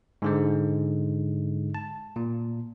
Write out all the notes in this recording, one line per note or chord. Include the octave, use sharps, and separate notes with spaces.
G#2 D3 G#3
A5
A#2